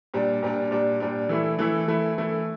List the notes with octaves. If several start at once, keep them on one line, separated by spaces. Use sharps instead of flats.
A#2 G3 D4
A#2 G3 D4
A#2 G3 D4
A#2 G3 D4
E3 A3 E4
E3 A3 E4
E3 A3 E4
E3 A3 E4